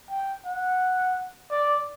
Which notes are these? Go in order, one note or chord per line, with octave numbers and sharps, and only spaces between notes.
G5
F#5
D5